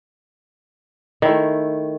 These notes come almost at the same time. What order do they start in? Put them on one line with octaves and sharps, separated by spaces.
D#3 E4 A3